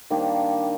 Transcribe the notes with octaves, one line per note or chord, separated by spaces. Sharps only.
D#3 G3 A#3 D4